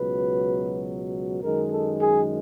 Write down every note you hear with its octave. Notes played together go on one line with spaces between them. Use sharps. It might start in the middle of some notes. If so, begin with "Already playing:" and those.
Already playing: C#2 B2 F#3 B4
F#2 D#3 G#3 A#4
A4
G#4